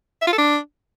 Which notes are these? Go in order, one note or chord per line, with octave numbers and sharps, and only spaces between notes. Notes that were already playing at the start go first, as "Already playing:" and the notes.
E5
F4
A4
D4